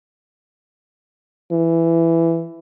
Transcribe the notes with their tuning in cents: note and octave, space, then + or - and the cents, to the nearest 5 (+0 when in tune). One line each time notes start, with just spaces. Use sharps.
E3 +10